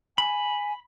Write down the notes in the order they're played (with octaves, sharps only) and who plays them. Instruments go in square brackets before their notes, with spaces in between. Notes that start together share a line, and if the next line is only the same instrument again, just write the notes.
[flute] G#5 [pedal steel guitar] B5